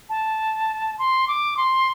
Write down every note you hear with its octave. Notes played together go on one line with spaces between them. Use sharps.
A5
C6
D6
C6